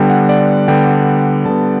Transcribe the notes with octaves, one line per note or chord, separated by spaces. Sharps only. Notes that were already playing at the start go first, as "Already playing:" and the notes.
Already playing: D3 G3 B3 G5
F#5
D5
D3 G3 B3 G5
D3 G3 B3 A5